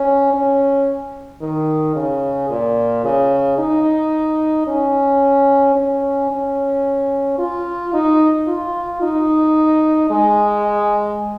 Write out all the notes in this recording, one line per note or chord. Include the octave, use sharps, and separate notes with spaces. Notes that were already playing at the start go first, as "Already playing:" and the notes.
Already playing: C#4
C#4
D#3
C#3
A#2
C#3
D#4
C#4
C#4
C#4
F4
D#4
F4
D#4
G#3